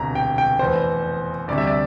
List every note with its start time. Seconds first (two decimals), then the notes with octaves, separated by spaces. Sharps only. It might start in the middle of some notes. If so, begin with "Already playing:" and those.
Already playing: E1 D2 C3 A#5
0.15 G5
0.38 G5
0.59 F1 E2 E3 C5
1.48 D2 C3 G3 D5
1.58 E5
1.67 D5